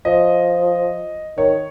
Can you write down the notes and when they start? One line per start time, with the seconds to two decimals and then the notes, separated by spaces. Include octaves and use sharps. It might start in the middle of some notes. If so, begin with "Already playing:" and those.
0.05 F3 D#5
1.38 D#3 C#5